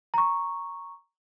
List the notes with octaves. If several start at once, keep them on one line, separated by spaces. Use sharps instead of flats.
A#5 C#6